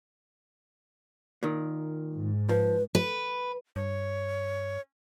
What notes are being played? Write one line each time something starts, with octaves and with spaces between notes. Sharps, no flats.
A#2 D#3
G#2
F3 B4
B4
G2 C#5